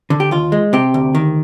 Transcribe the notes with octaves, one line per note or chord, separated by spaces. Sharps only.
D3
G4
D#2 F4
G#3
C3 G4
D2
D#3